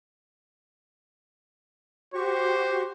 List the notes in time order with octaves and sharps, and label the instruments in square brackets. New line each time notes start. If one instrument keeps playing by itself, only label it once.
[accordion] F#4 G4 C#6 [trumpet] C5